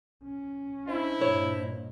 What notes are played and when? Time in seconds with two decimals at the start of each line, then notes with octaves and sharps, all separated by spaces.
0.24 C#4
0.88 D4 E4 C5 D#5
1.21 G2 A#2 C#5